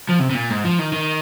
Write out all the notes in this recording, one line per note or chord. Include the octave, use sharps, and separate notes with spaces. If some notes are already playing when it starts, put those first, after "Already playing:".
F3
C3
C3
A#2
G#2
F3
D#3
D#3